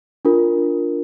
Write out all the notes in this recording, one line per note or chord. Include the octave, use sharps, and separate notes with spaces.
D4 F4 A#4